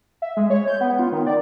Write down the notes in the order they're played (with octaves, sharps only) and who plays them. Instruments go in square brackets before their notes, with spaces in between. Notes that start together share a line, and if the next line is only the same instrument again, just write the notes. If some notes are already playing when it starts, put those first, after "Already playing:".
[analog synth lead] E5
G#3
C#5
G6
B3
F4
D#3
D5